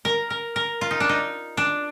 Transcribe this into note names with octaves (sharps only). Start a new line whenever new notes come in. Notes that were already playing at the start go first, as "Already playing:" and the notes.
A#4
A#4
A#4
F4
D#4
D4
D#4
D4